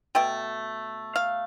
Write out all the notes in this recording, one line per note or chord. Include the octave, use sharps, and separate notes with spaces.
B2 A3 G5
F5